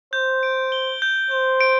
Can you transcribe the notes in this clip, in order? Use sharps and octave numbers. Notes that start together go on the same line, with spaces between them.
C5 G6
D7
G7
G6
C5 G6
D7